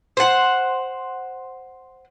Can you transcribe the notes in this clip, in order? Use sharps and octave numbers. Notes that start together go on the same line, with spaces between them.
C5 F#5